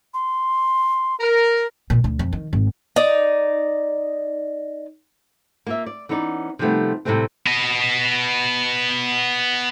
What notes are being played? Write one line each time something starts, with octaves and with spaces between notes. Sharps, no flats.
C6
A#4
A#2
D2
F2
D#3
G#1
D#4 D5
A#3 F4 E5
D5
E3 B3 C#4 D#4 C#5 D5
C3 D#3 F3 G3 A3 B3
A2 C3 F#3 G3 A3 C4
B3 D#5